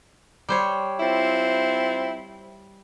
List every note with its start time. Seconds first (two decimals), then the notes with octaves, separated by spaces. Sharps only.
0.49 G3 C5 C#5
1.00 C4 E4 F4